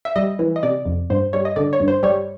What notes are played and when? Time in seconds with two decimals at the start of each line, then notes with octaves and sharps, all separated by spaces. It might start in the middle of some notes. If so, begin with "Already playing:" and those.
0.05 E5
0.16 G3 D#5
0.39 E3
0.56 D#5
0.63 C3 D5
0.86 F2
1.10 G2 C5
1.33 G3 C#5
1.45 D#5
1.56 D3 D5
1.73 C#5
1.80 G2
1.88 C5
2.03 G3 C#5